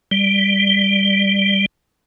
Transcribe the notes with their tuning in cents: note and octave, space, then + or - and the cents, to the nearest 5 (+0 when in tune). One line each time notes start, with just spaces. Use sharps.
G3 +10